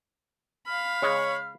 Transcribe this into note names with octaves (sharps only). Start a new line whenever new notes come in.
F5 B5 F6
C#3 G#3 C#5